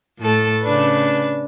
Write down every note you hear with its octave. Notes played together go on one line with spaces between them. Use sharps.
A2 A3 A4
C#3 D4 B4